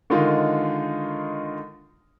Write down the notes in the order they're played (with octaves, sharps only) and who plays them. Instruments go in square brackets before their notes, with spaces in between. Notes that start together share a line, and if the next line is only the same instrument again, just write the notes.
[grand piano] D3 D#3 G#3 D#4 F4